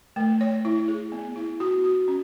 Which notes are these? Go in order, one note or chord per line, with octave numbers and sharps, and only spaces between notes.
A3
C#5
E4
G#4
B3
E4
F#4
F#4
C#4